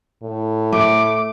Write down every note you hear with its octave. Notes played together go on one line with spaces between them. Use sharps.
A2
A3 D6